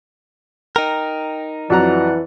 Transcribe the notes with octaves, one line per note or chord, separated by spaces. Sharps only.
D#4 A#4 G5
F2 E3 F#3 D5 F#5 A#5 F#6